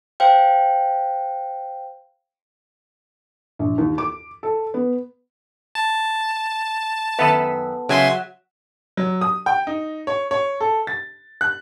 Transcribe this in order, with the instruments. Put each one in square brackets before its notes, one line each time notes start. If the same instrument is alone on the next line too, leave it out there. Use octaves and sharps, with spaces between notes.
[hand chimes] C5 F5 G5
[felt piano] A#1
D#2
D6
A4
B3
[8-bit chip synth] A5
[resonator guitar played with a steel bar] F#2 D#3 E5 [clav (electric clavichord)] B3 A4 B4
[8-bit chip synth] C#3 G#5 C6 [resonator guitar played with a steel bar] F#3 E5
[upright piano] F#3
D#6
G5
D#4
C#5
C#5
A4
A6
F#6